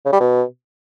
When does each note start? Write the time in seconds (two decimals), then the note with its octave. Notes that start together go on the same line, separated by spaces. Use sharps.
0.05 C#3
0.13 G3
0.20 B2